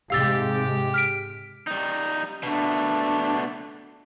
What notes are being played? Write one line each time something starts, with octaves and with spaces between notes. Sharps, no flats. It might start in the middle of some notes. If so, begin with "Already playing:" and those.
G#2 C3 G#3 G4 F5 E6 A6
F6 B6 D7
G3 D#4
B2 A3 D4